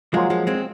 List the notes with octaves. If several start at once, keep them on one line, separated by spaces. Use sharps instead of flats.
F3 F#3 G#3 A#3 F4 G#4
F3 G#3
G#3 C4